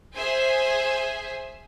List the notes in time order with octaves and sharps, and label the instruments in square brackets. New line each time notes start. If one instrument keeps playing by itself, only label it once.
[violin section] G#4 C5 E5 G#5